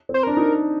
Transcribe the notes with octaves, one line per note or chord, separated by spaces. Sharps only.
C4
C5
D4 A#4
D#4